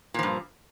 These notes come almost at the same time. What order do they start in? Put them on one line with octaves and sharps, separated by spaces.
A#2 F3 G2